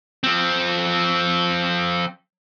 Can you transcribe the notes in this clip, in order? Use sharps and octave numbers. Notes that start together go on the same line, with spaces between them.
F3 C4